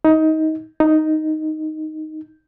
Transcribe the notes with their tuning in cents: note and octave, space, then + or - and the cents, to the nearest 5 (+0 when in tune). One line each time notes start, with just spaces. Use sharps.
D#4 +20
D#4 +0